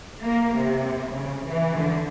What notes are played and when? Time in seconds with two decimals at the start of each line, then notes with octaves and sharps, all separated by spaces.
0.22 A#3
0.55 C3
1.10 C#3
1.44 E3
1.77 D3